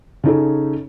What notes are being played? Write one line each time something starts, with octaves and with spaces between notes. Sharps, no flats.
C#3 C#4 D#4 G#4 A4